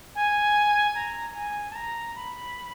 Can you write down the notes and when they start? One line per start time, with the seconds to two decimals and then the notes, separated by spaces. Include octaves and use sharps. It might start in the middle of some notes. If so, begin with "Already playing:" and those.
0.15 G#5
0.95 A#5
1.35 G#5
1.71 A5
1.75 A#5
2.15 B5